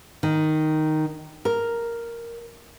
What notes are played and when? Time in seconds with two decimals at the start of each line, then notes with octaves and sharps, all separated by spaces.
0.23 D#3
1.45 A#4